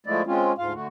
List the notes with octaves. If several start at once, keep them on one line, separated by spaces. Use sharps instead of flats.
F3 G#3 A3 E4 D5
G#3 C4 C#4 F4
D2 G#2 F4 F5
D3 A3 F#4